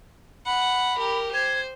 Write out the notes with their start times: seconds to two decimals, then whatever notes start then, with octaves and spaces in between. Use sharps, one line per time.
0.46 F#5 B5
0.98 G4 A#4
1.34 C5 G#6